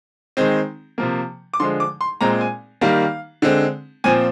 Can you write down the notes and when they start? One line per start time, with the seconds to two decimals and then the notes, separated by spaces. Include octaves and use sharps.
0.37 D#3 G#3 C4
0.98 C3 F3 A#3
1.54 D6
1.60 D3 F3 G#3 C6
1.80 D6
2.01 C6
2.21 A#2 G#3 C4 A#5
2.41 G#5
2.81 D#3 G3 A#3 F5
3.42 D3 G#3 C4
4.04 A#2 F3 C4 G#5